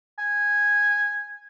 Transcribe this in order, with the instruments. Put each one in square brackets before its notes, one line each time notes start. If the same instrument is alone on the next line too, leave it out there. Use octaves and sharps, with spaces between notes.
[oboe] G#5